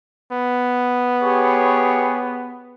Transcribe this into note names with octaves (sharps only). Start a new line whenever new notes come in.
B3
G4 G#4 C#5